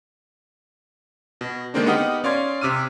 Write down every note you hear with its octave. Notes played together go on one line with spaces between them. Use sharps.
B2
D3 D#3 G#3 A#3 C4 D4
B3 D#4 G4 F#5 D#6 F6
C#4 D5 F5 C6 G#6
C3 D6 E6 F6 D#7